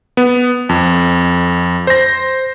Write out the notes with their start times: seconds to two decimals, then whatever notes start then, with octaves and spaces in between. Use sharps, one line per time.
0.17 B3
0.69 F2
1.87 C5 A#6